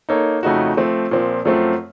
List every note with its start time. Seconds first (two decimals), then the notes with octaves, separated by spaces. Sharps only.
0.09 A#3 D#4 A4 C#5
0.43 F2 C#3 A3 D#4 F#4
0.77 F3 A3 C4
1.11 A#2 F3 C4
1.45 F#2 F3 A3 C4